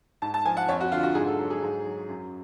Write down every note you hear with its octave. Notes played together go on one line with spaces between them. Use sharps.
G#2 A5
A5
F3 G#5
F#5
F2 C#5
F#4
D3 F4
F#4
G#2 G#4
A4
F#3
G#4
G#2
F#3
F#2